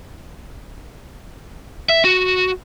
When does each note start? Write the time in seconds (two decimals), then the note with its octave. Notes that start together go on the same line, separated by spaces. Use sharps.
1.89 E5
2.05 F#4